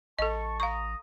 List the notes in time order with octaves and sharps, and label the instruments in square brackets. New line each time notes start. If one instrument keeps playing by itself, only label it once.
[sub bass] A1 [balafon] A4 D#5 [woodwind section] A5 C#6
[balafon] F5 C#6 [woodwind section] A#5 D#6